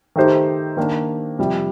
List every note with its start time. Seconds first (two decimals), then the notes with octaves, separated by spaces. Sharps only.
0.16 D#3 A3 D#4 G4 C5
0.77 D#3 A#3 D4
1.38 F2 C3 G3